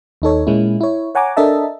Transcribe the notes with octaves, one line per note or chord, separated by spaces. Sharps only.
D#2 D#4 A4 C#5
A#2 G#3 A#3 C#4 E4
E4 C#5
C#5 F#5 G#5 A#5 D6
D4 A4 A#4 D#5 E5 A5